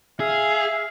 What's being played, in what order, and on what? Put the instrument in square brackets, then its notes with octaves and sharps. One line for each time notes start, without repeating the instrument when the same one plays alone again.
[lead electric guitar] G#4 [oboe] E5 [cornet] F5